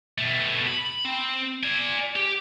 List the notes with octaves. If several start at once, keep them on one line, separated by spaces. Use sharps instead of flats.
B2 A3
B5
C4
D5 G#5
G4